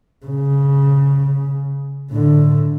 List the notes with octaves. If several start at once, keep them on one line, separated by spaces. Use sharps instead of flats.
C#3
A2 D3